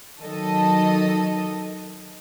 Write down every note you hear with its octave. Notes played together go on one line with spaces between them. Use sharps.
D#3 F#3 A4 D#5